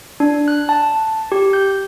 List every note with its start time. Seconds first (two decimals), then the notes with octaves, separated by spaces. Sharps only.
0.20 D4
0.48 F#6
0.69 A5
1.32 G4
1.53 G6